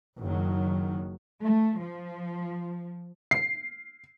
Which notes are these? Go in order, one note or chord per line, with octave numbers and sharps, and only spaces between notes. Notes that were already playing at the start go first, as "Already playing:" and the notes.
F#1 D#3 F#3
A3
F3
C7